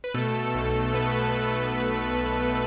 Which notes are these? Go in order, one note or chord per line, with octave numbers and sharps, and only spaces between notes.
B4
B2 A3 A4
B1
B1 B3 B4
B3 B4
B2 B3 B4
A3 A4
B2
B1